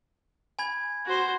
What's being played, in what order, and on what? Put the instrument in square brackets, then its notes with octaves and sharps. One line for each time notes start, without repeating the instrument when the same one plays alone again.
[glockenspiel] G#5 B5 G#6
[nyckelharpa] F#4 C5